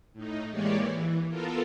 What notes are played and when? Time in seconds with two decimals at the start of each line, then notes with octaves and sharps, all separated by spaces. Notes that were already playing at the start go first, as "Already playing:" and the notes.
0.13 A2 D#4
0.51 E3 G#3 A#3 G4 C#5 D5
0.80 E3
1.29 B3 F4 A4 A#4